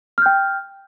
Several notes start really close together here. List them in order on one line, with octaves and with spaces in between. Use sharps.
F6 G6 G5